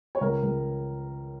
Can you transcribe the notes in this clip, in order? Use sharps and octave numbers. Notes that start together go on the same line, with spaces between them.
C#5
C#2 A#4
C#2